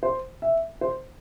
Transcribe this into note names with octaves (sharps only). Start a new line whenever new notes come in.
C5
E5
C5